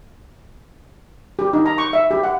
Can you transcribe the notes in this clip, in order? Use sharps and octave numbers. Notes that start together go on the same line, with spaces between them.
G4
D#4
A#5
C#6
E5
G4
F#5